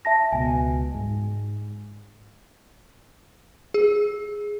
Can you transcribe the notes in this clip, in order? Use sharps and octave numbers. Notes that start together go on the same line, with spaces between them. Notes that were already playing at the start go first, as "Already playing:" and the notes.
E5 A5 A#6
C#2 B2 G#5
G#2 G#3
G#4